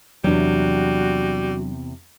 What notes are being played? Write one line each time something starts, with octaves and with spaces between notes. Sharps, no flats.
E2 C3 F#3 G3 D4 F#4